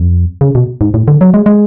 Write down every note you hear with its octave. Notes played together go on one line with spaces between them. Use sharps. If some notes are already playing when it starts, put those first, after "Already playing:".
Already playing: F2
C#3
B2
G#2
A2
D3
F#3
G#3
G#3